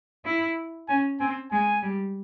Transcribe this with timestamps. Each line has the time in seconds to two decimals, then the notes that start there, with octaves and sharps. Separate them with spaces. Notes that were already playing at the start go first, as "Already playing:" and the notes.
0.25 E4
0.88 C#4 G#5
1.20 C4 G#5
1.52 G#3 G#5
1.83 G3